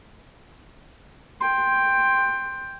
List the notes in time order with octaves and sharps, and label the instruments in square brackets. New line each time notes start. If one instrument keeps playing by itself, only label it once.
[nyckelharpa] G5 C6